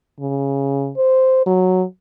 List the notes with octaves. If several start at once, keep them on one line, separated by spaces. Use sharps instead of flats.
C#3
C5
F#3